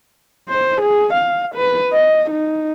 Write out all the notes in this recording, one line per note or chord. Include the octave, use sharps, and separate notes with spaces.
C5
G#4
F5
B4
D#5
D#4